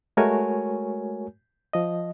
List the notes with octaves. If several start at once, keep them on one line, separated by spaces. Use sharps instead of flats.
G#3 A3 F#4 A#4 C#5 G#5
F3 D#5